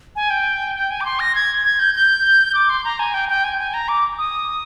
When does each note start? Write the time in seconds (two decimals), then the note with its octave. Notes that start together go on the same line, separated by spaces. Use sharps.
0.16 G#5
0.30 G5
0.75 G5
0.91 G#5
1.01 D6
1.05 C6
1.20 A#6
1.35 G#6
1.65 G#6
1.79 G6
1.95 G6
2.55 D6
2.69 C6
2.84 A#5
2.99 G#5
3.14 G5
3.29 G5
3.44 G#5
3.59 G#5
3.74 A#5
3.88 D6
4.18 D#6